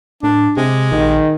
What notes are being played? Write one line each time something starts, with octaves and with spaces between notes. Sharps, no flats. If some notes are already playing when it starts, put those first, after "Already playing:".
A2 D4
C3 G#3 G4
A#1 D#3